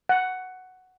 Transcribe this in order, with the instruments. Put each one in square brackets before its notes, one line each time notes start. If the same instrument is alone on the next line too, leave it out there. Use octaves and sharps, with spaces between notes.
[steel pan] F#5